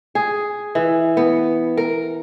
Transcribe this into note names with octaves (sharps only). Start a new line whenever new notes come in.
G#4
E3
B3
A#4